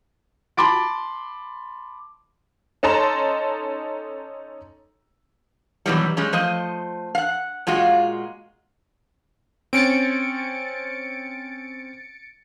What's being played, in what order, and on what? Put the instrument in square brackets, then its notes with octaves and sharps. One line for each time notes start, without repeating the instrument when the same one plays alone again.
[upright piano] A5 B5 C6 D6 A6 D7
[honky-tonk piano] C#4 D#4 A4 A5 A#5 C6
[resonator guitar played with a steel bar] B2 D#3 E3 F#3 G3
G3 G#3 C#4
F3 A3 C5 D#5
F5 F#5
A#2 G#3 F4 F#4
[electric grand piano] C4 C#4 [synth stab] A6 C#7 D7